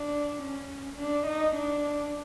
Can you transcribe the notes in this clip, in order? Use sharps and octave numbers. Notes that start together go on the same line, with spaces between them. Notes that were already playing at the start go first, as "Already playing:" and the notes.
Already playing: D4
C#4
D4
D#4
D4